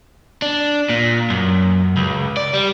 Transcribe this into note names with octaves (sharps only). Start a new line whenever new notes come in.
D4
A#2
F#2
C#2
D5
G3